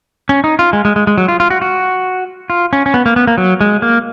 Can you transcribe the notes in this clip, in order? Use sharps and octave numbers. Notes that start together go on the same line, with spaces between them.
C#4
D#4
F4
G#3
G#3
G#3
G#3
F#3
F4
F4
F#4
F#4
F4
C#4
C#4
B3
A#3
B3
A#3
F#3
G#3
A#3